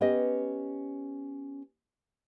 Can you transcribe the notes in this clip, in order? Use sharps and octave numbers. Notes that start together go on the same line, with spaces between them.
B3 C#4 G4 D#5